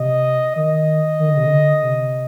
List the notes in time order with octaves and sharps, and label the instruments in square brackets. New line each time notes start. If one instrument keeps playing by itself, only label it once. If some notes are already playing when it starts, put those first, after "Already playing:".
Already playing: [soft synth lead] C3 [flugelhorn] D#5
[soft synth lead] D#3 [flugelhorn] D#5
[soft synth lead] D#3
D3
C3
D3
C3